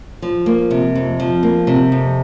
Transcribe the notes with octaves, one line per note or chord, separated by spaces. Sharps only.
F3
A#3
C3
F2
F3
A#3
C3
F2